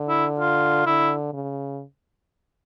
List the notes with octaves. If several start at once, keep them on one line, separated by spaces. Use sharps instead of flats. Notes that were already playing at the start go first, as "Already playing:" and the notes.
Already playing: D3
E4
F4
D3 E4
C#3